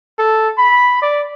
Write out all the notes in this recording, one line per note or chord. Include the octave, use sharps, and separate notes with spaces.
A4
B5
D5